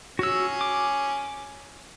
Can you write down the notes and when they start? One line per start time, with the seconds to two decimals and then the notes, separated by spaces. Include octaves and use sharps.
0.19 C#4 F#4 G#4 E6
0.61 D6